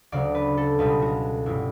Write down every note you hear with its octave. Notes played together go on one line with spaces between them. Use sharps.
D2 C#3 F#3 D5
B4
A4
C#2 B2 G3 B4
F#4
G1 C#3 F#3 E4